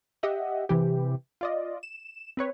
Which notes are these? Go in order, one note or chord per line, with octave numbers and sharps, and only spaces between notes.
G4 D#5 E5 F#5
C3 E3 G4
F4 D5 D#5
E7
C4 B4 C#5